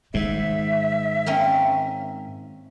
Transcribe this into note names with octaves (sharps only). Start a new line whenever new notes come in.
G#2 D#3 G#3 E5
A#3 C4 C#4